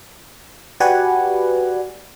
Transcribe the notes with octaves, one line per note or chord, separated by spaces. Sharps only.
F#4 G4 B4 D5 F#5 G#5